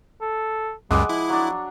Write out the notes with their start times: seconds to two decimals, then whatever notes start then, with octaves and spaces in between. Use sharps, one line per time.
0.21 A4
0.91 C#2 F#2 G3 G#3 F#5 D6
1.09 F3 E4
1.30 F#3 D4